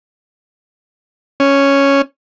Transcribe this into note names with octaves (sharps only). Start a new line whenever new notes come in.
C#4